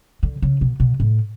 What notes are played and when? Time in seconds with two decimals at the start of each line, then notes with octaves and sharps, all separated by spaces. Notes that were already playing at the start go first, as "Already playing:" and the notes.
0.23 D3
0.42 C#3
0.61 B2
0.80 B2
1.00 A2